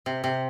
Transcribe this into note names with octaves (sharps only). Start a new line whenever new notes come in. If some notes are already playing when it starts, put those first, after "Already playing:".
C3
C3